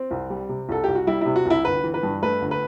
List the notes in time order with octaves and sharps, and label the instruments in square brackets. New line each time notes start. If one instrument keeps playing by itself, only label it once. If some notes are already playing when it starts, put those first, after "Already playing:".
Already playing: [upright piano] C4
C2
G3
C3
C2 A4
C2 G4
F#4
G3 E4
C3 E4
F#4
C2 E4
G1 B4
E3
B4
G2
A3 B4
G1
B4